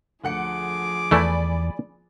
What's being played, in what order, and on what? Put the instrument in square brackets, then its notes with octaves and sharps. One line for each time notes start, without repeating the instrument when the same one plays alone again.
[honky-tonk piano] D2 F#5 C#7 [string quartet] F3 G#4 D6
[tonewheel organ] E2 [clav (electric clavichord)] E3 A3 E4 [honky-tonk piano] D5 G#5 B5